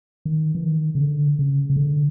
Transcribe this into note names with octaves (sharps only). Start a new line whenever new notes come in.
D#3
E3
D#3
C#3
D3
C#3
C#3
D3